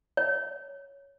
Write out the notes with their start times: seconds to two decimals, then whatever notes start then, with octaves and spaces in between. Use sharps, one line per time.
0.17 C#5